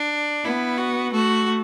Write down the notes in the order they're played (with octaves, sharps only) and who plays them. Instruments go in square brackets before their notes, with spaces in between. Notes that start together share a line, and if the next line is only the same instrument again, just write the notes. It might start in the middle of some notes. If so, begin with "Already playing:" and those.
Already playing: [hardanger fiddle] D4
[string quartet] B3 [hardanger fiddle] E4
[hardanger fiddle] F#4
[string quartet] A3 [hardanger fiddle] F#4